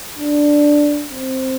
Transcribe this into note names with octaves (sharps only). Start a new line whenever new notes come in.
D4
C4